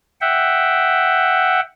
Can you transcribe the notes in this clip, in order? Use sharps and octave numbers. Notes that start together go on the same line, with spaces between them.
E5 F#5 G5